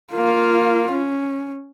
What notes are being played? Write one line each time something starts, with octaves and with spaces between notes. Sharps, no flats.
A#3 F4
C#4